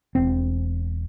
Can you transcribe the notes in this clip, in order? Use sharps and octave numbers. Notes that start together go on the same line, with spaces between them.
E1 C4